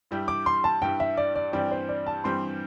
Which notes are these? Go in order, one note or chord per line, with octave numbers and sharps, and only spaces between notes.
G2 G3 E4 G4
D6
C6
A5
G2 G3 E4 G4 G5
E5
D5
D5
G2 E3 G3 C4 G4 D5
C5
D5
A5
G2 E3 G3 C4 G4 C6